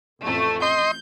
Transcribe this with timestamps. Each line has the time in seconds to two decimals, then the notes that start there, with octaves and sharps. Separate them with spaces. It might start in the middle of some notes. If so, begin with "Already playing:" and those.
0.22 A1 F2 A3
0.62 D#5 C6 G6